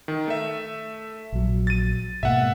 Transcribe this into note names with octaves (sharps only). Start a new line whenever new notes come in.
D#3
A3 E5
A#1 F#3
A6 D#7
G#2 B2 A#3 E5 F#5